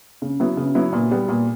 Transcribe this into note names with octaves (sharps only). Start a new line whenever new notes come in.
C#3
F#3 B3 E4
C#3
F#3 B3 E4
A#2
G3 B3
A#2